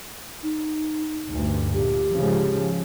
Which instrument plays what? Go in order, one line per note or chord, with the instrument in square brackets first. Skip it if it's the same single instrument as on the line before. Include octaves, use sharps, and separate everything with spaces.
[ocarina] D#4
[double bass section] D2 G2
[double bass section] A#2 [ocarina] G4
[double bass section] G#2 C#3 F3